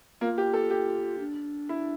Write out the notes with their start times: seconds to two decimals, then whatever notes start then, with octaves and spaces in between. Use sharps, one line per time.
0.21 A#3 F4
0.38 G4
0.54 A4
0.70 G4
1.19 D4
1.69 E4